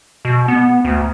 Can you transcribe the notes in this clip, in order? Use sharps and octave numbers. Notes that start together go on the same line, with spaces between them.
B2
B3
D2